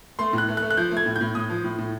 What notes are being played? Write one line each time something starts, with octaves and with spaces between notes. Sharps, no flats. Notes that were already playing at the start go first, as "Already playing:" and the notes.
A3 C6
A2
F#6
A3
F#6
A3
F#6
F3 G6
A3
G#6
A2
G6
A2
A2 D#6
F3
A2
A2